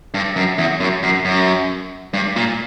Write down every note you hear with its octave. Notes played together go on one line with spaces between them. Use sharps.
G2
F#2
E2
F#2
F#2
F#2
G2
A#2